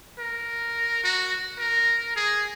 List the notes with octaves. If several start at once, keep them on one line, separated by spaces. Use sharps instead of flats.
A#4
F#4
A#4
G#4